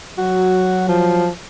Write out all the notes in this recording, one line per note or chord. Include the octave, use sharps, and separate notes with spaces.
F#3 F#4
F3